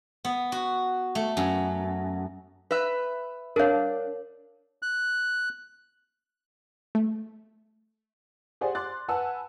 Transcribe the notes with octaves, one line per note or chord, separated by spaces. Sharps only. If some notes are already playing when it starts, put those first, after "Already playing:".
B3
F#4
A3
F#2
B4 E5
D4 A#4 C#5 F5
F#6
A3
G4 G#4 C5 D5 F#5 G#5
C6 D6 F#6 A6
B4 F#5 G#5 A5 E6